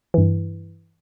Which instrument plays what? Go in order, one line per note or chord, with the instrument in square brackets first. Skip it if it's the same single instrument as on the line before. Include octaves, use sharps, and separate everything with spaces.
[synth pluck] G2 E3